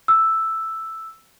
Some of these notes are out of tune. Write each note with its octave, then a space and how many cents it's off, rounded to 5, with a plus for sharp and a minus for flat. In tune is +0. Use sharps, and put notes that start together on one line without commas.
E6 +0